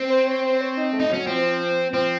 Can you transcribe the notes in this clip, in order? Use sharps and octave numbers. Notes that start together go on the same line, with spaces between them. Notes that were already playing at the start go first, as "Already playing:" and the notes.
Already playing: C4
C5
C#5
C5
C#5
D#4
A3
D#4
F#3 C#4
F3 C4
F3 C4